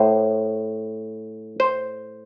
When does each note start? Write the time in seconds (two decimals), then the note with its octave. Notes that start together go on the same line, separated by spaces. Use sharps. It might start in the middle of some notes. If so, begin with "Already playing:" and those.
Already playing: A2 C5
1.60 C5